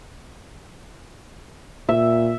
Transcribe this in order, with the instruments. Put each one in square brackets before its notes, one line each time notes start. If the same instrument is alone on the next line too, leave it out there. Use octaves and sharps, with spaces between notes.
[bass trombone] A#2 [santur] E5